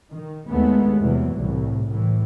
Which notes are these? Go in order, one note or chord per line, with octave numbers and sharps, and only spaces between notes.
D#3
D#2 G#3 A3 B3
E2 C3 E3 F#3
C2 A2
A2 E3